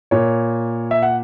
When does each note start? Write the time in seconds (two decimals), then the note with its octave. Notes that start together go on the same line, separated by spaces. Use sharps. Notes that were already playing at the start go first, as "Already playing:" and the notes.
0.11 A#2 C#5
0.91 E5
1.02 F#5